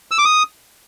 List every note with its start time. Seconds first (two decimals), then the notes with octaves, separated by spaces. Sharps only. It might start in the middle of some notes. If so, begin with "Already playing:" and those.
0.11 E6
0.18 D6
0.25 D#6